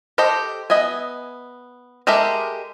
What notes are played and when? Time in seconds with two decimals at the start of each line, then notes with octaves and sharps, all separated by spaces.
0.18 G4 A4 C5 D#5 G5
0.70 B3 D#5 E5 G#5
2.07 G#3 G4 A4 A#4 E5